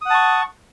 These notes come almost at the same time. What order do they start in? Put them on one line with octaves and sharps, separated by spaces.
D#6 F#5 A5 C#6